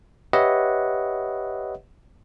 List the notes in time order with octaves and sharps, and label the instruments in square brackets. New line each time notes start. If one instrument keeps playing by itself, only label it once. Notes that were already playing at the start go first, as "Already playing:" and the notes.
[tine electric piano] G4 B4 C#5 D#5 E5 F#5